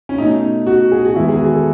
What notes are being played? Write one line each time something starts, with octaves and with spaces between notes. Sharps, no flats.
C#4
B2 A3 D#4
F#4
G#4
F#4
E2 D#3 G#3 B3 E4
G#4
F#4
A4